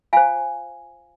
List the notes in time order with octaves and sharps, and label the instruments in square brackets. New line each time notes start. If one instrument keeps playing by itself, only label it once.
[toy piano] F4 C5 F5 G#5